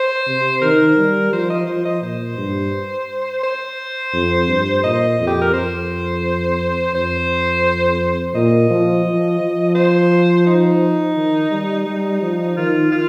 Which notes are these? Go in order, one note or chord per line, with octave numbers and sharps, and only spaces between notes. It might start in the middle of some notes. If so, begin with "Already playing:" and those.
Already playing: C5
C3
D#3 A#4
G3
F3 C5
D#5
F3 C5
D#5
A#2 C5
G2
C5
F2
G2
A#2 D#5
F2
G4
A#4
F2 C5
F2 C5
A#2 D#5
F3
F3
F3
C5
D#4
D#3
G3
G3
F3
D#3 F4
F4